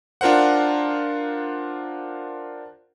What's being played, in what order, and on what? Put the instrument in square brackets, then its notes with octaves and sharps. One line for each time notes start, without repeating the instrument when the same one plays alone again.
[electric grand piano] D4 F4 A#4 C5 F#5